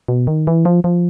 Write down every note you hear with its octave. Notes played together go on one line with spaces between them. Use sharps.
B2
D#3
E3
F3
F3